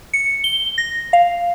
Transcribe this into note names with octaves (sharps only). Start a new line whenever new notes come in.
C#7
G7
A#6
F5